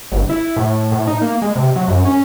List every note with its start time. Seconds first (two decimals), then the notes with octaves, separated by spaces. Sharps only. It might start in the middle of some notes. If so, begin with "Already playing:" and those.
0.12 G1
0.30 E4
0.56 A2
0.92 A2
1.07 D#4
1.21 A#3
1.42 G#3
1.56 C3
1.76 F#3
1.88 F#2
2.05 C#4